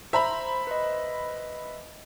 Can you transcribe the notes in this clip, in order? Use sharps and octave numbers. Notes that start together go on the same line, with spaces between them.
C5 E5 A#5 B5
B4 D#5